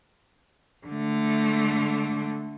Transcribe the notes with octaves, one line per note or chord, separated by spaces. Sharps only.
D3 A3